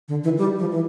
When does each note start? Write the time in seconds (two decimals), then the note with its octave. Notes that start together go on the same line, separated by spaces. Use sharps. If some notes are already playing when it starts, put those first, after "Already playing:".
0.08 D3
0.24 E3
0.38 G3
0.59 F3
0.71 E3